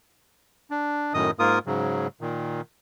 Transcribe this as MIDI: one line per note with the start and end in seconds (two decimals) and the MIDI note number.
0.71 1.13 62
1.14 1.31 42
1.14 1.31 45
1.14 1.31 51
1.14 1.31 75
1.14 1.31 87
1.39 1.59 44
1.39 1.59 58
1.39 1.59 65
1.39 1.59 70
1.39 1.59 87
1.66 2.07 44
1.66 2.07 49
1.66 2.07 54
2.21 2.61 46
2.21 2.61 51